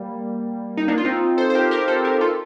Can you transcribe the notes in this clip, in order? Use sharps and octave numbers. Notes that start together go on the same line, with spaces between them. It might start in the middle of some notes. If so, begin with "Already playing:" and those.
Already playing: G3 A#3
D#4
A#3 D4
F4
C4 D#4
A4 C5
C5
G4 A#4
G4 A#4
A4 C5
G4 A#4
F4 A4